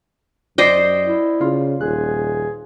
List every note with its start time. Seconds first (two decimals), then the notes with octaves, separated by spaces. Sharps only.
0.58 F#2 C5 D5 D#5 G5
1.05 E4
1.41 C#3 F4
1.81 D#1 G#4 F#6